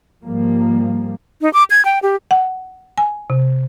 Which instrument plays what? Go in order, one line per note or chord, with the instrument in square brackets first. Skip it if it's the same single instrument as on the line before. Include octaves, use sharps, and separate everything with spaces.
[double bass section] G#2 F3 G3 A#3
[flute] D#4
D6
G#6
G5
G4
[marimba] F#5
G#5
C3